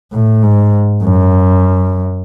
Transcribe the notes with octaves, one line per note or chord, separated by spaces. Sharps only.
A2
G#2
F#2